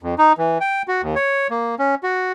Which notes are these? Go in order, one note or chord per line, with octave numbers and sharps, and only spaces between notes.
F2
D#4
E3
G5
F#4
D#2
C#5
A#3
C#4
F#4